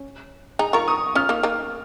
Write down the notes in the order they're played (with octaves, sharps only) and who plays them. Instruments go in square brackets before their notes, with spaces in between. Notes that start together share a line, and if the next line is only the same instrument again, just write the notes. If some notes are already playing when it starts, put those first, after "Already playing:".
Already playing: [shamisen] C#4
[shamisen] D#4 G#4 [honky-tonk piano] A#5
[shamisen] F4 A#4 [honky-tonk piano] C#6
[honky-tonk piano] D#6
[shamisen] C#4 F4 [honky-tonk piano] F6
[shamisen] A#3 D#4
A#3 D#4